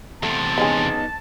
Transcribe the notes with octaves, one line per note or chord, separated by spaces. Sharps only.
E2 C3 A3 A5
G#3 B3 C#4 D#4 G#4